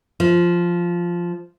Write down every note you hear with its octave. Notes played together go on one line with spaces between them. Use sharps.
F3